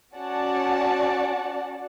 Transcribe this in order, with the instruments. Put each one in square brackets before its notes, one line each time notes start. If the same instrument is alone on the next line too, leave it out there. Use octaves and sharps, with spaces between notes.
[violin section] C#4 F#4 D5 F#5 A5